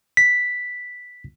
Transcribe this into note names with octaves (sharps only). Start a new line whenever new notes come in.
B6